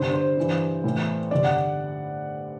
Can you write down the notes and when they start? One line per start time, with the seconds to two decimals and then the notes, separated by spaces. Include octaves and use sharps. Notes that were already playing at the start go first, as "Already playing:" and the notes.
Already playing: G2 D3 C5
0.13 C5
0.37 G2 E3
0.84 A2 E3
1.31 G2 D3 D5
1.44 F#5